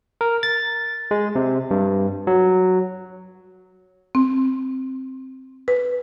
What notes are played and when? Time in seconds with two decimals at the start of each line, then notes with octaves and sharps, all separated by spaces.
0.21 A#4
0.43 A6
1.11 G#3
1.35 C3
1.71 G2
2.27 F#3
4.15 C4
5.68 B4